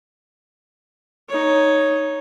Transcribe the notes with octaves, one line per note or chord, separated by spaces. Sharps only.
D#4 C#5